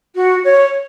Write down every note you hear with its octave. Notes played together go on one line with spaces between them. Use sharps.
F#4
C#5